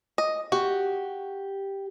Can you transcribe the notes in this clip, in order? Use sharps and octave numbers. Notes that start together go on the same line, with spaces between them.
D#5
F#4 G4